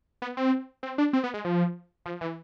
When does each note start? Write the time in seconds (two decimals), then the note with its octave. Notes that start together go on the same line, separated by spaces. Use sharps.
0.22 B3
0.37 C4
0.83 C4
0.98 D4
1.13 C4
1.24 B3
1.34 G#3
1.45 F3
2.06 F3
2.21 E3